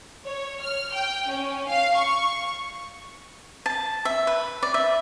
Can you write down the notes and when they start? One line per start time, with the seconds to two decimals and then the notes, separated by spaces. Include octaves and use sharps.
0.25 C#5
0.60 F6
0.92 G5
1.29 C#4
1.68 F5
1.97 C#6
3.66 A5
4.05 E5
4.27 B4
4.63 D5
4.74 E5